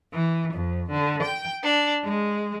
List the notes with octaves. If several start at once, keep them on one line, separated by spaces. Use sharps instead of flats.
E3
F2
D3
G5
D4
G#3